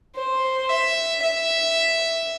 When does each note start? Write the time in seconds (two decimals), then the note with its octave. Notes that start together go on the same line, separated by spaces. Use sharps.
0.15 C5
0.69 E5
1.22 E5